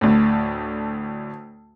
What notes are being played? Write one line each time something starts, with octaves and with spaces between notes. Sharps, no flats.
D2 A2